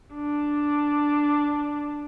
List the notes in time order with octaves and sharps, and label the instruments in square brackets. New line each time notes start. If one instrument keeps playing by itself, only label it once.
[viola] D4